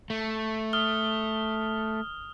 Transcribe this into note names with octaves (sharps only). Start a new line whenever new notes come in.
A3
D#6 F6 G7